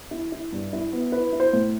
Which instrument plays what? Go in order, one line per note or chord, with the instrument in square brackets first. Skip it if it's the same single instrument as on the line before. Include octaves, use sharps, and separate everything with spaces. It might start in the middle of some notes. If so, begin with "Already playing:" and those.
[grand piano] E4
E4
G2
E4
B3
E4 B4
E4
C5
A2